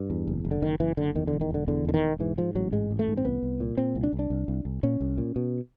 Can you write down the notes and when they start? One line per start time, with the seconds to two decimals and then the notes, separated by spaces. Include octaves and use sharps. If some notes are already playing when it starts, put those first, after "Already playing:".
Already playing: G2
0.10 E2
0.27 F#1
0.45 F#1
0.51 D3
0.62 F#1 D#3
0.80 F#1 E3
0.97 F#1 D3
1.15 E2 D#3
1.27 D3
1.33 E1
1.41 D#3
1.50 E1 D3
1.68 E2 D3
1.85 E1 D3
1.94 D#3
2.02 E1
2.20 G#2 E3
2.38 G#2 F3
2.55 A1 F#3
2.72 G#2 G#3
2.91 A1
2.99 A3
3.08 G#2
3.17 C4
3.25 C2 B3
3.43 C2
3.60 A#2
3.77 A#2 C4
3.95 C2
4.03 D4
4.13 C2
4.19 D4
4.30 C2
4.48 C2
4.65 C2
4.83 A#2 C#4
5.01 C2
5.18 A#2
5.36 B2